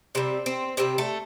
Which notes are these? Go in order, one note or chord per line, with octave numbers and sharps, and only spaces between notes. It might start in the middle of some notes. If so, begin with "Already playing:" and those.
C3 G3 C4
C4
C3 G3 C4
A3